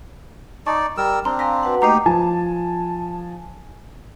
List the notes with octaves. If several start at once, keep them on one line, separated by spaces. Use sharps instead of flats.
D#4 D5 A5 C#6
G3 A#4 E6
C4 D4 A#5 C6
F5 G#5 A#5 C6 A#6 B6
F#4 B4 F#5
A3 A#3 D#4 G4 D#5 A#5 C7 F7
F3 G#5 A5